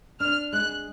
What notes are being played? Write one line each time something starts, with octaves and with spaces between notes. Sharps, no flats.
D4 F6
G#3 F#6